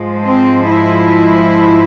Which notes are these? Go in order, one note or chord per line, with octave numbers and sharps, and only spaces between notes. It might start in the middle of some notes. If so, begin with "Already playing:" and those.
Already playing: G#2 F3 G#3
C4
E4